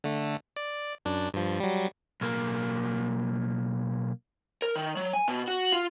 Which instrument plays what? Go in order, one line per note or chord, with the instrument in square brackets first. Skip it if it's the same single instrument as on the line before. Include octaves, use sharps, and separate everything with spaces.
[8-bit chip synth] D3 A3
D5
F#2 D4
G2 F3
F#3 G3
[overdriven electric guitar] B1 A#3
[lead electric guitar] A#4
D#3
F#3
G#5
B2
F#4
F4